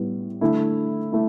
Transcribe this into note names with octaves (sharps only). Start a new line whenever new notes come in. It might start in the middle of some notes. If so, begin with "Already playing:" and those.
Already playing: A2 G3 B3
D3 A3 E4
A3 E4